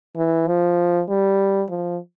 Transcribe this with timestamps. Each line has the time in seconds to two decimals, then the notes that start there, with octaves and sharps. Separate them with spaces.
0.17 E3
0.47 F3
1.09 G3
1.70 F3